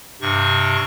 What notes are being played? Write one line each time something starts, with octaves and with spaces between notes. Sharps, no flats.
G2 C3 C#6